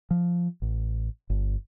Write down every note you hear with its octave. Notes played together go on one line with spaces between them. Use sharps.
F3
A1
G1